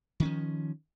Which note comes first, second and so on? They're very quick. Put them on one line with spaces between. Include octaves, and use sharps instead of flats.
D#3 C#4 F3